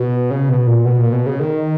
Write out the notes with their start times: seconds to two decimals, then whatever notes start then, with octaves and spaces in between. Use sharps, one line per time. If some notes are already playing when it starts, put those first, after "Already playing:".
Already playing: B2
0.30 C#3
0.49 B2
0.67 A#2
0.85 B2
0.98 A#2
1.12 B2
1.26 C#3
1.40 D#3